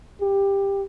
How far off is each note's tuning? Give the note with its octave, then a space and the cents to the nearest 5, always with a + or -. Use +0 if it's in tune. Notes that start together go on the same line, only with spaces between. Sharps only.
G4 +15